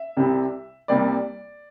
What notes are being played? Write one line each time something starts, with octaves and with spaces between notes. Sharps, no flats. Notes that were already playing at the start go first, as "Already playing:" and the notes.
Already playing: E5
C2 C3 G3
C2 C3 G3 A#3 D5